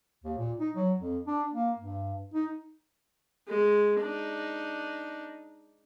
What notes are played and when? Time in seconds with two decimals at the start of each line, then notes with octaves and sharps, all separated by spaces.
0.24 D#2
0.38 A#2
0.60 D#4
0.75 F#3
0.99 F2
1.26 D4
1.53 A#3
1.78 G2
2.34 D#4
3.48 G#3
4.00 D4 D#4